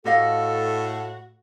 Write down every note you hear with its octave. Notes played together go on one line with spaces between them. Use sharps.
A2 F#4 G4 A4 D#5 F5